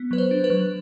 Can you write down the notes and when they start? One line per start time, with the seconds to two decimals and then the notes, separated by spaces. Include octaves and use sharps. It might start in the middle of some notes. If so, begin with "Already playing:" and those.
Already playing: B3
0.11 F#3 B4
0.18 C5
0.31 D4
0.44 B4
0.50 F#3